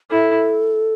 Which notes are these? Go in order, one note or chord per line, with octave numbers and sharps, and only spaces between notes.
E4 A4